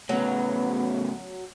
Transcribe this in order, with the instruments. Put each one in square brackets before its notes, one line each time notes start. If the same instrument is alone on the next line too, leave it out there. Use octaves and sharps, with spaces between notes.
[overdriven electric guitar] A2 C#3 [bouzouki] F#3 [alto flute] B3